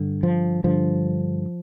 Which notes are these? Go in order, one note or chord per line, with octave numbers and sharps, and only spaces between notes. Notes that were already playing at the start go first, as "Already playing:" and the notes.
Already playing: G2 D3
F3
G2 D3 F3